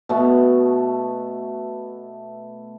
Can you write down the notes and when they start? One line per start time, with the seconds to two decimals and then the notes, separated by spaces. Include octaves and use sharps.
0.09 B2 A3 B3